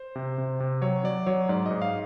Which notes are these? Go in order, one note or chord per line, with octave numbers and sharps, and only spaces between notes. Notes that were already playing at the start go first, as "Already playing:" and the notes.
Already playing: C5
C3
C3
C3
F#3 C#5
F#3 D5
F#3 C#5
G#2 D5
G#2 D#5
F5